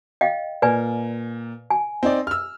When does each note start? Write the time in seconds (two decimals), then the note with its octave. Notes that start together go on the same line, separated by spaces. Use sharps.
0.21 D#5 F5 G5
0.62 A#2 B4 D5 G#5
1.70 G#5
2.03 C4 D#4 D5
2.27 E6 F6